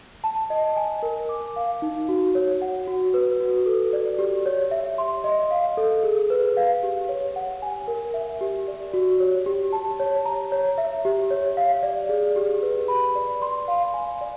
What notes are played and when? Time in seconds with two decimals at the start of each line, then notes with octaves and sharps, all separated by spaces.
0.24 A5
0.50 D#5
0.77 G#5
1.03 A#4
1.29 D6
1.56 F5
1.82 D#4
2.09 F#4
2.35 C#5
2.62 F#5
2.88 F#4
3.14 B4
3.40 F#4
3.66 A4
3.93 D5
4.19 G4
4.46 C#5
4.71 E5
4.98 C6
5.24 D#5
5.51 F5
5.77 A4
6.03 G#4
6.30 B4
6.57 F5
6.83 G4
7.09 C#5
7.36 F#5
7.62 G#5
7.88 A#4
8.14 E5
8.41 G4
8.68 D5
8.94 F#4
9.20 C#5
9.46 G4
9.73 A5
10.00 C#5
10.25 A#5
10.52 C#5
10.78 E5
11.05 G4
11.31 C#5
11.57 F5
11.83 D5
12.09 G#4
12.36 G4
12.62 B4
12.88 B5
13.15 D5
13.42 C6
13.68 F5
13.94 G#5
14.21 D5